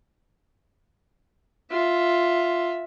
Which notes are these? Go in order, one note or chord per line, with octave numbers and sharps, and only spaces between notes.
F4 E5